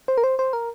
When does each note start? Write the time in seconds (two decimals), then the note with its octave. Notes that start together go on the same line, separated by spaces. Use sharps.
0.08 C5
0.18 A#4
0.24 C5
0.39 C5
0.53 A#4